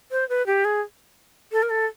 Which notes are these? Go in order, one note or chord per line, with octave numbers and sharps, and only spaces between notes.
C5
B4
G4
G#4
A4
A#4
A4